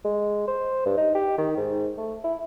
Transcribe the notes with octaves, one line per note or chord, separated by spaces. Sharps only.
G#3
C5
G2
D#4
G4
D#3
G#2
A3
E4